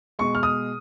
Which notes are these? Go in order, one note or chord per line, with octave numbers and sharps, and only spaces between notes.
B2 G#3 C#6
F6
D#6